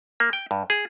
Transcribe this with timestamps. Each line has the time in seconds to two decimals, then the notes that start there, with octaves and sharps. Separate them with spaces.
0.20 A#3
0.33 G5
0.51 G2
0.70 G#4